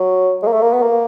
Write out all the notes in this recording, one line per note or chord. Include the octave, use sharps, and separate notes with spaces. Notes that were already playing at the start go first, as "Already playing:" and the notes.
Already playing: F#3
G#3
A#3
A3
A#3
B3
A#3